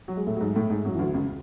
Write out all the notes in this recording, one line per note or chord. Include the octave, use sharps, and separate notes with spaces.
F#3
G#3
A2 A3
F#3
G#2 G#3
A2 A3
G#2 G#3
F#2 F#3
E3
D2 D3
C#2 C#3